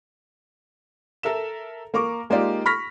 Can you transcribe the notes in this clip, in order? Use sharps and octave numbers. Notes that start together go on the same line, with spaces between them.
A4 A#4 E5 E7
A#3 A#4 C#6 D6
G#3 A#3 D#4 F4 G4 D5
B5 C#6 F6 A#6 B6